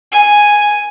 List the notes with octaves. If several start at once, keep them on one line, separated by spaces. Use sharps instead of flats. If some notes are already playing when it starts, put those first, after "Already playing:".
G#5